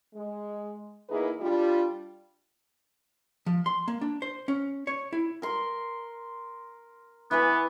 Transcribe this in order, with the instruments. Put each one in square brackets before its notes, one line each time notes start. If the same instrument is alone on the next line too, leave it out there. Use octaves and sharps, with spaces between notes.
[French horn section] G#3
E2 A#3 D#4 E4 G#4 B4
G3 D4 F4
[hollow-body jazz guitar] F3
C6
A#3
D4
C5
C#4
C#5
E4
[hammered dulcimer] A#4 C6
[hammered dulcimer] E3 B4 G#5 [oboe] B3